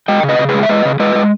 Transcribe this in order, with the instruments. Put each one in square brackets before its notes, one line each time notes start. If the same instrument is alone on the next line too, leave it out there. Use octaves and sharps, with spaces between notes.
[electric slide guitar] G#3 D#5 G5
C#3
B4 D#5
C#3
G#4 B4
G#3
E5
G#3 B4 D#5
C#3
G#3 B4 D#5
G#3